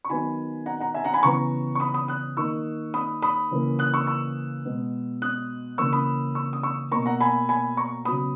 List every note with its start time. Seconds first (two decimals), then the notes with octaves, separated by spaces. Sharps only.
0.05 C#6
0.10 D#3 F#3 B3 G#5 B5
0.66 F#5 A#5
0.80 F#5 A#5
0.94 E5 G#5
1.04 F#5 A#5
1.14 G#5 B5
1.23 C#3 E3 B3 A#5 C#6
1.75 C#6
1.80 B5 D#6
1.94 B5 D#6
2.08 D#6 F#6
2.37 D#3 A#3 C#6 E6
2.94 B5 D#6
3.22 B5 D#6
3.51 C#3 E3 A#3
3.79 D#6 F#6
3.94 C#6 E6
4.07 C#6 E6
4.65 B2 G#3 B3
5.22 D#6 F#6
5.78 C#3 E3 A#3 C#6 E6
5.93 B5 D#6
6.35 C#6 E6
6.53 D#6
6.63 C#6 E6
6.92 B2 A#3 A#5 C#6
7.06 F#5 A#5
7.20 G#5 B5
7.49 G#5 B5
7.77 A#5 C#6
8.05 C#3 F#3 B3 B5 D#6